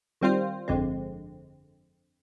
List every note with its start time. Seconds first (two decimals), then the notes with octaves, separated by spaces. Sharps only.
0.21 D#3 G3 C4 F4 C5
0.68 G1 F2 D3 G#3 C4